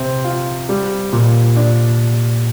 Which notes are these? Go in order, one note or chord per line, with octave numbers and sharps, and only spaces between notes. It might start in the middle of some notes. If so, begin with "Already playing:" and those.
Already playing: C3 C4
F4
G3
A#2
D4